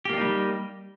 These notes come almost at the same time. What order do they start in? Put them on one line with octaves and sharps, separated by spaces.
G4 A#3 D4 D#4 G3